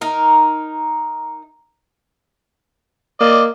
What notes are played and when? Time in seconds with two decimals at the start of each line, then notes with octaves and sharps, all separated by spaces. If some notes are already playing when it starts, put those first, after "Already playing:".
0.01 D#4 A#4
3.20 A#3 D5 D#5